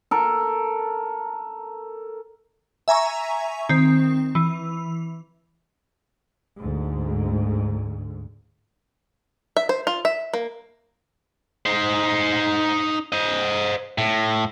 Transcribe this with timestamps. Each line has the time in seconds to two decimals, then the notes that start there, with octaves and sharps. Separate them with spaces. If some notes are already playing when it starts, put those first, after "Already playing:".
0.11 A4 A#4
2.88 E5 G#5 A#5 C#6
3.69 D#3 C4
4.35 E3
6.58 D2 G#2
9.57 E5
9.69 C5
9.87 F4
10.05 E5
10.34 A#3
11.66 D#4 C5
13.12 C5 D#5
13.98 A2